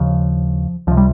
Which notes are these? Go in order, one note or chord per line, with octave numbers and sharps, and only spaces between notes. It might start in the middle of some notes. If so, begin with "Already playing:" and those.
Already playing: D#2 C#3 F3
C#2 C3 F3
G3